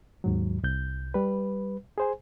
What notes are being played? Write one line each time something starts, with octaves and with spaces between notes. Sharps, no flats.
D#2 G#2 F#3
C2 G6
G3 B4
G#4 C5 G#5